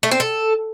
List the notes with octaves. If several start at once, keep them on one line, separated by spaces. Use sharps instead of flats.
A3
C4
A4